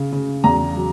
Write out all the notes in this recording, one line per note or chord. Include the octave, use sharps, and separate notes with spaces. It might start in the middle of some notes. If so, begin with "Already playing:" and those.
Already playing: C#3
C#3
E2 A#5
F#3